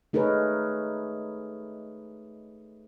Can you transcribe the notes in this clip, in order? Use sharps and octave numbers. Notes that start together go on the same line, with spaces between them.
A3 D#4 G#4 A#4 B4 C#5